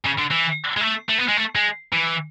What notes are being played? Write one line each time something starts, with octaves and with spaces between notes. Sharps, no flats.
C#3
D3
E3
G#3
A3
A3
B3
G#3
A3
G#3
E3